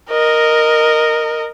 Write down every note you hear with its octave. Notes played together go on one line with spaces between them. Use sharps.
A#4 D#5